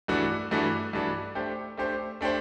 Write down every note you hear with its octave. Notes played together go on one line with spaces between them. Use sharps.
G2 E3 A3 D4 F#4
G2 E3 A3 D4 F#4
G2 E3 A3 D4 F#4
A3 D4 G4 C5
A3 D4 G4 C5
A3 D4 G4 C5